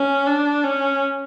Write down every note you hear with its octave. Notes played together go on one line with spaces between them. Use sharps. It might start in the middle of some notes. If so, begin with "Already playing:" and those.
Already playing: C#4
D4
C#4